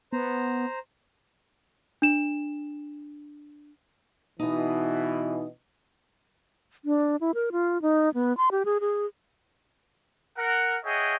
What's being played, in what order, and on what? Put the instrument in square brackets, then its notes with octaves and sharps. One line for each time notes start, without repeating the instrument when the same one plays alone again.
[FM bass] B3 [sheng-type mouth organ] C5 A#5
[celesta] D4 E7
[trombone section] B2 E3 [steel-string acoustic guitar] D#4 D#5
[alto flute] D4
E4
A#4
F4
D#4
B3
C6
G4
G#4
G#4
[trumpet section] A#4 F#5
G#4 C#5 D#5 E5 F#5 G5